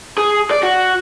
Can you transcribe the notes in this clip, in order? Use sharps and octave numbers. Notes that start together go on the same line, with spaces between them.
G#4
D5
F#4